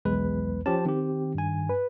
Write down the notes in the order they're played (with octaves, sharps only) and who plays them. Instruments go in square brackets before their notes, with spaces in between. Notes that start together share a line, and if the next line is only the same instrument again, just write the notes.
[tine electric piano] B1 E2 B4 [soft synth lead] G#3
[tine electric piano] F3 G4 A5 [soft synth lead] C#4
[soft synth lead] D#3 [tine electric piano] C4 G4
[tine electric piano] G2 G#5
[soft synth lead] B4